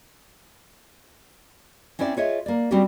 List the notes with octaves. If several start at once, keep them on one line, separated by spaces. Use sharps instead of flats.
C4 C#4 E4 C5 D5
F4 G#4 C#5 D#5 E5
A#3 D5
G3 C4 C#4 F#4 G4